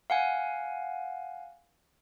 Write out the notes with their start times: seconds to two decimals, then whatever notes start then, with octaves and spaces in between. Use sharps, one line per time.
0.10 F5 F#5 G#5